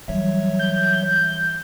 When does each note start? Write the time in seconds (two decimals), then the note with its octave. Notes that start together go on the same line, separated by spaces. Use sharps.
0.08 E3 F#3 G3 C#5 E5
0.59 G6